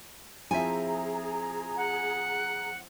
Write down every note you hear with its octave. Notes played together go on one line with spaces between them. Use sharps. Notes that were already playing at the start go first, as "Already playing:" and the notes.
F3 C4 E4 G#4 E5 G#5 A#5
F#5